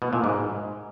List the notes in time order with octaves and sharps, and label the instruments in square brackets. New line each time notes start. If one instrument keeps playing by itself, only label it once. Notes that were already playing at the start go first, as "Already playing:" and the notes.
[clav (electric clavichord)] B2
A#2
G#2